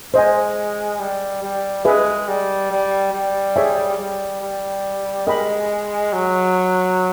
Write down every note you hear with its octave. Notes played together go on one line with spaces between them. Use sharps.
G#3 C5 D#5 G#5
G3
G3
G#3 G#4 B4 E5
G3
G3
G3
G#4 C#5 E5 G#5
G3
G3
G#3 A#4 D#5 G5 B5
F#3